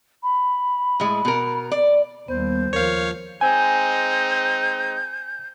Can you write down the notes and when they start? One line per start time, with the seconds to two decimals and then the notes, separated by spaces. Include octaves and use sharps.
0.23 B5
1.00 A2 G#3
1.25 B2 A#4
1.71 D5
2.28 D#2 G3 B3 C5
2.73 D#2 F3 A#4 C#5 F5
3.41 G#3 C4 D#4 G#5 G6